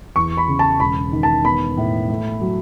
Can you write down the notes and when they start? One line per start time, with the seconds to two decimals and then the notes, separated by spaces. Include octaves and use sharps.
0.16 E2 C#6
0.37 B5
0.48 C#3
0.59 A5
0.80 E1 B5
1.12 D#3
1.23 A5
1.44 B3 B5
1.77 A2
2.09 A3
2.41 F#3